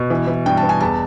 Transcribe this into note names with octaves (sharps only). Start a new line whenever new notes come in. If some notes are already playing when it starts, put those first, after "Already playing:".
Already playing: B2
E3
E3
G2 G5
A5
B3
G#5
E2 A5